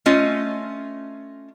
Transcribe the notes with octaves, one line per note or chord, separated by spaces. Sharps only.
A3 C#4 F4 D#5